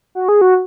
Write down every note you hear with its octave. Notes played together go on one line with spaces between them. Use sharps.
F#4
G#4
F#4